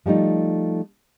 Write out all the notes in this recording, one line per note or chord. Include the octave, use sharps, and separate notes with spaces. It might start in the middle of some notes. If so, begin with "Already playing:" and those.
F3 G3 A3 D#4